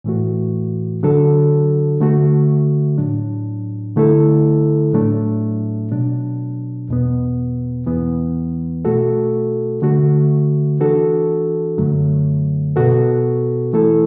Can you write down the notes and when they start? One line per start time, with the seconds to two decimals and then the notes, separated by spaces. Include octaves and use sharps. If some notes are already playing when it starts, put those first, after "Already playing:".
0.04 A2 E3 A3 F#4
1.03 D3 F#3 D4 F#4 A4
2.00 D3 A3 F#4
2.98 A2 F#3 D4
3.96 D3 A3 E4 A4
4.93 A2 F#3 A3 D4
5.91 B2 F#3 D4
6.89 E2 B2 B3
7.86 E2 E3 B3
8.85 B2 A3 F#4 A4
9.82 D3 A3 F#4
10.80 E3 D4 F#4 A4
11.78 F#2 D3 F#3 A3
12.76 B2 B3 F#4 A4
13.73 E3 A3 E4 A4